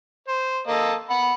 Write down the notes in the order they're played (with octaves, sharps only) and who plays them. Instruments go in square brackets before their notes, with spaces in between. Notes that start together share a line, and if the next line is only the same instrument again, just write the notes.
[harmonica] C5
A#3 A4 D#5
F#5 B5